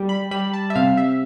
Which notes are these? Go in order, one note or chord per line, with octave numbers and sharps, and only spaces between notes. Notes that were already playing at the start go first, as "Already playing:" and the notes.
Already playing: G3
B5
G3 B5
A5
E5
C3 F5
E5